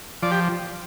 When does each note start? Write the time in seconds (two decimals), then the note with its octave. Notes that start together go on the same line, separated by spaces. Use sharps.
0.22 F3 D5
0.31 G4